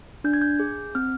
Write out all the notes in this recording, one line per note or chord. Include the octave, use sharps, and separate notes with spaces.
D4 G6
G#6
G6
G#4
C4 F6